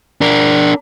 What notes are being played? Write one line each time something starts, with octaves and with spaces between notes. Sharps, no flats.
D4 A#4